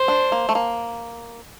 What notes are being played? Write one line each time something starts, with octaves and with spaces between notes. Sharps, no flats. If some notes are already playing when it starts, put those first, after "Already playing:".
Already playing: C5
D4
A#3
A3
A#3